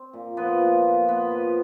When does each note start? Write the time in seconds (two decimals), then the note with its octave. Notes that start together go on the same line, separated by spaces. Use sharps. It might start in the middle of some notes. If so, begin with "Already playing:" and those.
Already playing: C4
0.13 A#2
0.37 F3 B3
0.61 A#2
0.84 A#2
1.08 A#2 B3
1.32 F3